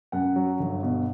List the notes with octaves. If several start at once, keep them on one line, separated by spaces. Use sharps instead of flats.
F#2 F#5
F#3
G1
B2